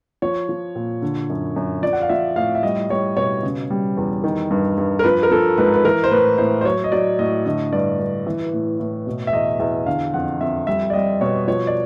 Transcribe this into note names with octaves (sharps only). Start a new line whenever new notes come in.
F3 C#5
F3
A#2
D3
F#2
F#2
F3 D5
F#5
F5
F3 E5
A2 F5
E5
G3 D#5
G3 C#5
B2 C#5
C#3
G3
E2
D#3
G2
G2
A#4
F3 B4
A#4
F3 A4
G#2 B4
B4
E3 A#4
C5
A2 B4
A2 C5
C5
F#3 C#5
D#5
F#3 D5
A2 D#5
D3 D#5
G2 D5
G2
E3
A2
A2
B2
E5
E2 D#5
E2 E5
D3 F5
F2 F#5
F2 E5
G3 E5
D5
G3 D#5
B2 C#5
F3 C#5
D5